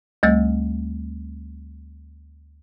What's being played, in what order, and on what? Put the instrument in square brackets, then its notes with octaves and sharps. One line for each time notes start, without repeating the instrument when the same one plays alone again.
[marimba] D2 G3 A3 E6